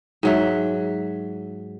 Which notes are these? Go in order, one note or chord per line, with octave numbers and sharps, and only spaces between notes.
G#2 F#3 E5